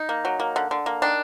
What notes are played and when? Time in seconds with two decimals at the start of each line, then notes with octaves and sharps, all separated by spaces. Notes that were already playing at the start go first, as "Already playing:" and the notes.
Already playing: D#4
0.09 A#3
0.25 F#3
0.40 A#3
0.56 D3
0.71 D3
0.86 A#3
1.02 D#3 D4